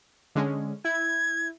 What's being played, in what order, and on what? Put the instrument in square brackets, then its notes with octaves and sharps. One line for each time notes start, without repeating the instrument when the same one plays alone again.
[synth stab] D3 G#3 C#4
[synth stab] E4 [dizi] G#6